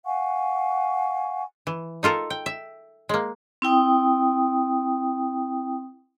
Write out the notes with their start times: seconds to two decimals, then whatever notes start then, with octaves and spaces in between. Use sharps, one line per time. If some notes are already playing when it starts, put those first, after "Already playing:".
0.05 F5 F#5 G#5 C#6
1.67 E3
2.03 D#4 F4 A4 A#4
2.30 G5
2.46 E5
3.09 G#3 A#3
3.62 C4 E4 G5 D#6